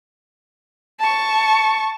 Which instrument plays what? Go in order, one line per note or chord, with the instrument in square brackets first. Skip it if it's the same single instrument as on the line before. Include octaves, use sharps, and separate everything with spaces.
[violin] A5 C#6